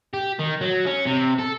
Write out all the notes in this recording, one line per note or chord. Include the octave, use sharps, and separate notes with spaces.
G4
D#3
F#3
C#4
C3
A4